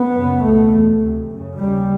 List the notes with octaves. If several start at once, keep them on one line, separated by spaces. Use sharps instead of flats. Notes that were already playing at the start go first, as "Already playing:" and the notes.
Already playing: B3
F#2 C#3
C#2 B2 A3
E2 B2
D2 C3
F#2 C#3
D#2 C#3 G3